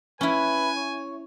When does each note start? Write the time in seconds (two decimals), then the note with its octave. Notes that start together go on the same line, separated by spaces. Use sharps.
0.21 C#4 E4 B4 G#5
0.76 C#5